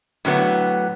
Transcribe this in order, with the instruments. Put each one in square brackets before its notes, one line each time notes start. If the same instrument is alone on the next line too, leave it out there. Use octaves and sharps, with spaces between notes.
[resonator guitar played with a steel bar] A2 D3 F#3 B3